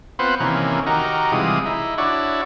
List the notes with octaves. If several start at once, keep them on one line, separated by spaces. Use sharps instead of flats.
B3 C4 F4 B4 C5 F#5
C3 D#3 E3 A#3 C#4
D#3 D#4 F#4 G4 A#4
C3 E3 G3 G#3 F4 D#6
D#4 E4
D4 E4 F#4 C#5 D5